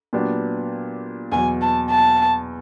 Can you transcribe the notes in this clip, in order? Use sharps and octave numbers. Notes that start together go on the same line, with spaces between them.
A#2 F#3 B3 D4 G4
E2 B2 F#3 G#5
A5
A5